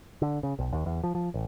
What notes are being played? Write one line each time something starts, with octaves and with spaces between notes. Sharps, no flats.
D3
C#3
B1
D#2
E2
F3
F3
A1